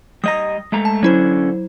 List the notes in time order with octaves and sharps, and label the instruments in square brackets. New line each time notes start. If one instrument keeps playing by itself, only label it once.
[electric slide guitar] G3 D#5 A#5 [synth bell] D#6 A#6
[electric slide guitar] G#3 A3 A#5
[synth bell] A5
[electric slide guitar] D3 C#4 [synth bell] F#3 E4 C5